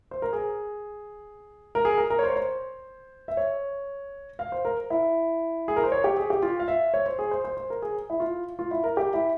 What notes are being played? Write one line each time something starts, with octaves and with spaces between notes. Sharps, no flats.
C5
A#4
G#4
A#4
G#4
A#4
A#4
C#5
C5
C#5
C5
E5
C#5
F5
C5
A#4
E4
G#4
A#4
C5
C#5
G4
G#4
G4
F4
F5
E5
C#5
C5
G#4
C5
C5
C5
A#4
G#4
E4
F4
F4
E4
A#4
G4
E4